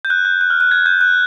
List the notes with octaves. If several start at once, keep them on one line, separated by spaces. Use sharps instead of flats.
G6
F#6
G6
F#6
F6
F#6
G#6
G6
F#6